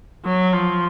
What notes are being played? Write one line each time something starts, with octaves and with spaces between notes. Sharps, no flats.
F#3
F3